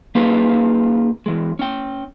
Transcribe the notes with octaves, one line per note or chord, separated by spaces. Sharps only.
A#3 C#4 D#4 F4 G#4 B4
E3 G#3
C#4 G5